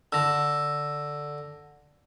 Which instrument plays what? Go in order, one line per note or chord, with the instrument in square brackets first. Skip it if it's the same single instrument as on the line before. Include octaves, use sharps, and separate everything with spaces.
[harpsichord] D3 [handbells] E6 A#6